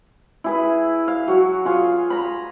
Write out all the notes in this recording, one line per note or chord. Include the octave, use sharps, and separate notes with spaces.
E4 G#4 B4
F5
F#3 F#4
F4 G#4 F5
A#5 B5